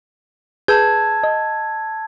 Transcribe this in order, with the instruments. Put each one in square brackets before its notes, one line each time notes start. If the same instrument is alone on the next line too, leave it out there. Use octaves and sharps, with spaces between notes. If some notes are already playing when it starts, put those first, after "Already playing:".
[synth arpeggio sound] G#4 B4 G6 [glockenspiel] A5 E6 G#6
[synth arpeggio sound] D#5